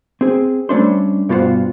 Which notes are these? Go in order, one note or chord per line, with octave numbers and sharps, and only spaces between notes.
C4 G#4
G3 A3 C#4 D4 C5
G2 B2 F4 F#4 C5 F#5